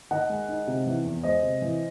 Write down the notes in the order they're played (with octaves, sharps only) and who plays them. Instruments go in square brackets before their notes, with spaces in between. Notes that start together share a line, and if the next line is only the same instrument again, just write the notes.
[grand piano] D#3 D#5 F#5
G#3
D#4
C3
E3
E2
G#3 C5 D#5
C3
E3